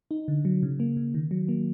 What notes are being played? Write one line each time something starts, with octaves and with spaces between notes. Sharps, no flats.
D#4
D3
F#3
C#3
A#3
C#3
D#3
F#3
A#3